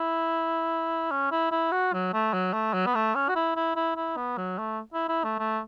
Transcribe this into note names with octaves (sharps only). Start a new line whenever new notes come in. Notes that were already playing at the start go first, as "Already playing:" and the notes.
Already playing: E4
C#4
E4
E4
F#4
F#3
A3
F#3
A3
F#3
B3
A3
C#4
F#4
E4
E4
E4
E4
B3
F#3
A3
E4
E4
A3
A3